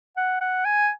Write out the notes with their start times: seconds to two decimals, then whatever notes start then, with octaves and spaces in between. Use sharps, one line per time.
0.17 F#5
0.41 F#5
0.65 G#5